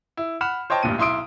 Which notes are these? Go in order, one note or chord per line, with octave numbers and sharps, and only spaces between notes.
E4
F#5 B5 F6 E7
C5 C#5 D#5 G5 A5
A1 G2 A#2 D#7
B1 E4 C6 D#6 D7